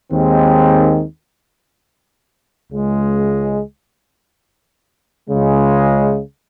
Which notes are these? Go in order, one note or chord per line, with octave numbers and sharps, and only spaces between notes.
D#2 D#3 G#3 C4
C#2 C#3 G#3
C#2 C#3 G#3